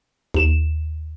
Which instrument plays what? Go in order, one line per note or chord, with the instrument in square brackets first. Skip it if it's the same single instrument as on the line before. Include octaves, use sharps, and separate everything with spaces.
[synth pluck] D#2 E7